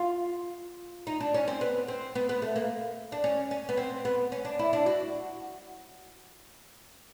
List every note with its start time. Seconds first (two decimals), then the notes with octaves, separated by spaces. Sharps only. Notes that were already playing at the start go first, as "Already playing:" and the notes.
Already playing: F4
1.07 D#4
1.21 D4
1.34 C#4
1.48 C4
1.61 B3
1.88 C4
2.15 B3
2.29 B3
2.42 A3
2.56 A#3
3.12 D4
3.24 C#4
3.51 C#4
3.69 B3
3.77 C4
4.05 B3
4.32 C#4
4.45 D4
4.59 E4
4.73 D4
4.86 F#4